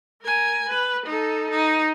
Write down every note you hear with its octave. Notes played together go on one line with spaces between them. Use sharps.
A#4 G#5
B4
D#4 A4
D#4